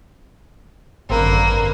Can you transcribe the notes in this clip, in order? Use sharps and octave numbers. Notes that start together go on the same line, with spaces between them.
G#1 F#2 D3 A#3 C4 A#4 B4